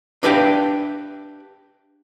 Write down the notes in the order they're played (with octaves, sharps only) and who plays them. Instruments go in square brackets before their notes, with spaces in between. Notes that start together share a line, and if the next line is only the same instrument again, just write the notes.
[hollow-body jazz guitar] D4 G4 B4 E5 F5 G5